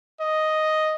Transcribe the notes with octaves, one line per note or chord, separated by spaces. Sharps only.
D#5